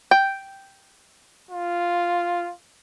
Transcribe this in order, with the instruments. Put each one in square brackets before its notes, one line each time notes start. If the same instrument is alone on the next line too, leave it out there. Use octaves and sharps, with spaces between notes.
[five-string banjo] G5
[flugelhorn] F4